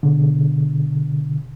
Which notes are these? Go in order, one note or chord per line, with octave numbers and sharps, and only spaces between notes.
B2 D3